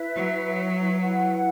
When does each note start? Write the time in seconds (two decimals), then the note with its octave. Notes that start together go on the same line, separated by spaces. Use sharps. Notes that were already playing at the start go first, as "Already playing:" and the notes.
Already playing: E4 B4 E5
0.17 F#3
1.01 E4 B4 F#5